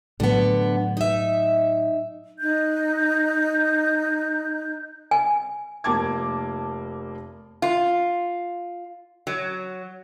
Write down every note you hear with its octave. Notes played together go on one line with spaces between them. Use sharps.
A2 D3 F#3 B3
D#4 E5
D#4 F#6 G6
G#5
F1 A#3 A5 D6 G#6
F4
F#3